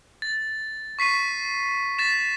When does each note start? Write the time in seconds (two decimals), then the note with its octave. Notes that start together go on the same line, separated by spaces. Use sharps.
0.22 A6
0.99 C#6 B6 C7 D#7
1.99 A6 B6 E7